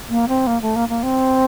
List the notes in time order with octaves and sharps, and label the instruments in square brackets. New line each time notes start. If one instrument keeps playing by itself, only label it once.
[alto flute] A#3
C4
A#3
A3
A#3
A#3
C4